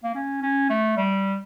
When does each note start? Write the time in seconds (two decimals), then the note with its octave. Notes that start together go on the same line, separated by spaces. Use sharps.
0.03 A#3
0.15 C#4
0.42 C#4
0.70 A3
0.97 G3